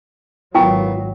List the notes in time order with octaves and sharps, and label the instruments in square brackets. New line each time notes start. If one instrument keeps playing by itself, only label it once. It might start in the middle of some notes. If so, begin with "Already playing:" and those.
[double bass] G#1 F#3 [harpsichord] A#2 B3 [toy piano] E4 G5 C#6